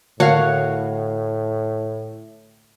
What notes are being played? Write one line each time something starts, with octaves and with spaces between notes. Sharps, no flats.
A2 D3 F#4 C#5 F5 F#5